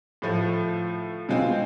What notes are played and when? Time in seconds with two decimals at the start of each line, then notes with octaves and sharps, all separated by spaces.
0.22 A2 F3 A3
1.29 B2 G#3 C4 F4